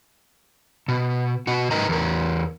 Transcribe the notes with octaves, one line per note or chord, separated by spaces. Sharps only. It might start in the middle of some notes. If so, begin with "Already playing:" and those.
B2
B2 F#4
G#2 D#4 A#4 B4 D#5 A#5
E2 A#4